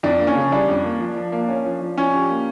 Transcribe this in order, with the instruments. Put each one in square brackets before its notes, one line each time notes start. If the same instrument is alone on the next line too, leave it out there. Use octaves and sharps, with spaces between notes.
[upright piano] F2 [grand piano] D4
[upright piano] A#3
[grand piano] C#4
[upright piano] C#3
[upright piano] G3 [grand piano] D4
[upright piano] F2
A#3
F3
F3
A#3
C#4
F3
F3
[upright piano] F3 [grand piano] C#4
[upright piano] G4
A#3